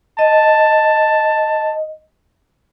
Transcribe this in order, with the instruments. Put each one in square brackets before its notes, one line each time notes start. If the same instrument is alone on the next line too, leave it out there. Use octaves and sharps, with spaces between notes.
[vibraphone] D#5 [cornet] A5